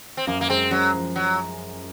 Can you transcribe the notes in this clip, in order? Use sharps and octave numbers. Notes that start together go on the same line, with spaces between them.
C4
F#2 A#3
A#3
G#3 C4
F#2 F#3
F3
F#3